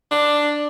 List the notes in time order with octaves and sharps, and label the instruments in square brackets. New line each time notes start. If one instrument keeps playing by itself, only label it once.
[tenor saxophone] D4